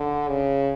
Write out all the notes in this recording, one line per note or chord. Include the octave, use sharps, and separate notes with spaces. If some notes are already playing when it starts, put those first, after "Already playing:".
Already playing: D3
C#3